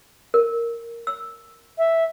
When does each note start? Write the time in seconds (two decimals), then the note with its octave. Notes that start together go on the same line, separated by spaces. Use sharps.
0.34 A#4
1.07 E6
1.78 E5